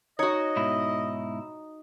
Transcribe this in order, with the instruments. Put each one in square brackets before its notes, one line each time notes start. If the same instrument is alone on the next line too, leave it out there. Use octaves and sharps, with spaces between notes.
[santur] D#4 [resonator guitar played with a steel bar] F#4 C#5 [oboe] D#5
[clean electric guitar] G#2 B2 E4